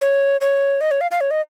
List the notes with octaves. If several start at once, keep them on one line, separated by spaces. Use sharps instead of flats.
C#5
C#5
D#5
C#5
F5
F5
C#5
D#5